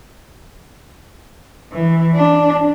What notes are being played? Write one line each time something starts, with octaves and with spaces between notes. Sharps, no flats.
E3
D4